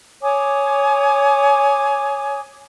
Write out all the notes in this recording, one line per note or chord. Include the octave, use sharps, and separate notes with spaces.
C#5 G#5 D6 D#6